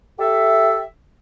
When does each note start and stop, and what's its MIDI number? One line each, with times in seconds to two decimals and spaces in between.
0.19 0.80 67
0.19 0.80 69
0.19 0.80 76